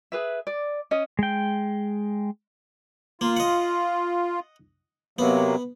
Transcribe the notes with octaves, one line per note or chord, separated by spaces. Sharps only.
G#4 B4 E5
D5
C#4 D#5
G#3 G5
A#3 F4
D#5 F#5
C3 F#3 A#3 B3